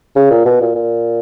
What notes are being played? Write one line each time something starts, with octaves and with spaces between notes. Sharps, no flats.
C#3
A#2
B2
A#2
A#2